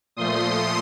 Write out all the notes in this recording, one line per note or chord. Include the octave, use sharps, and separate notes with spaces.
A#2 F3 A3 C6 D#6